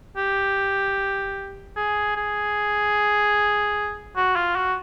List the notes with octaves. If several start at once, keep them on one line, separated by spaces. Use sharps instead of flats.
G4
G#4
G#4
F#4
F4
F#4